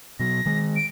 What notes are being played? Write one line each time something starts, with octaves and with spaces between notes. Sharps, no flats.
B2 F#3 A#6
D#3 G#3
D7